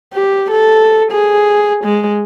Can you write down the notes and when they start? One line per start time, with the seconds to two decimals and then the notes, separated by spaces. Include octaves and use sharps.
0.13 G4
0.51 A4
1.11 G#4
1.84 G#3